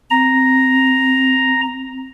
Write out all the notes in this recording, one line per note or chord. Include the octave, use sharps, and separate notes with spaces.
C4 A#5